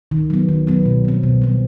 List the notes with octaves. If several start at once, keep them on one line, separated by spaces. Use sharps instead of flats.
D#3
F#3 B3
D#3
F#3 B3
B2
G3 C4
B2
G3 C4